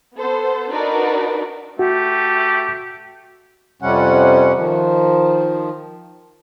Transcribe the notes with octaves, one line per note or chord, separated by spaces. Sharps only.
B3 A4 C5
D4 D#4 F#4 A#4 B4 D5
A3 F#4 G4
F2 C3 G3 C#4 F#5
D#3 F3